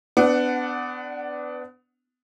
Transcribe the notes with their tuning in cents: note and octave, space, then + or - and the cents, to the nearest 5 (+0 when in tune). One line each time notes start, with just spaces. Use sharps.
B3 +30 D4 +0 F#5 +0